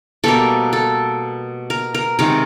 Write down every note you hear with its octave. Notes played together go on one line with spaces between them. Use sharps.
B2 G3 A#3 A4
A4
A#4
A#4
C3 D#3 G#3 A#4